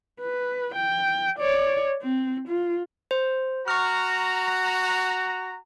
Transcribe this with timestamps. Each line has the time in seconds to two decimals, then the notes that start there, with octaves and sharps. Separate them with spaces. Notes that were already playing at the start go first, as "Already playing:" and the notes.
0.21 B4
0.75 G5
1.39 C#5 D5
2.02 C4
2.48 F4
3.11 C5
3.68 F#4 A#5 C#6 F6